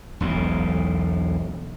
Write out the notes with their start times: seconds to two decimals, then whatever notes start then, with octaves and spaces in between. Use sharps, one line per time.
0.21 E1 B1 A2